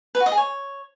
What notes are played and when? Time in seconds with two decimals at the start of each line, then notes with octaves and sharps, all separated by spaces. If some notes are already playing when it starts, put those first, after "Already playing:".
0.15 B4
0.20 F#4
0.26 D#5
0.32 G#4
0.37 C#5